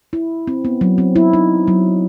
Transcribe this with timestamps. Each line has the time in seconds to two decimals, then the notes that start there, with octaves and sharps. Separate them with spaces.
0.13 E4
0.47 C4
0.65 B3
0.81 F#3
0.98 C4
1.16 E4
1.33 D#4
1.68 F#3